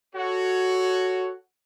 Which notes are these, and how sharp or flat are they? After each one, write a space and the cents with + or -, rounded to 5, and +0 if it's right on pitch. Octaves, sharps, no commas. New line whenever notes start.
F#4 +0 A4 +0 C#5 +5